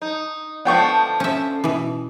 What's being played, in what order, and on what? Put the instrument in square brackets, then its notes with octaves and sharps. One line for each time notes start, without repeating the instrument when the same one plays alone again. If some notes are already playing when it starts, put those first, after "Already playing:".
[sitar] D#4
[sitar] D3 F3 A3 [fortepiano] B3 G5 C#6
[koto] C#4 E5
B2 E3